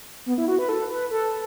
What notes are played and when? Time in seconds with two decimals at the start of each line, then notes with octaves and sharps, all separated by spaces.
0.26 B3
0.38 E4
0.48 F#4
0.59 B4
0.69 A4
0.90 B4
1.11 A4